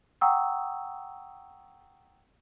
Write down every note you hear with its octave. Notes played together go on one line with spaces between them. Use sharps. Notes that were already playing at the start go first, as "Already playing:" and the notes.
F#5 G5 A#5 C#6 D#6 E6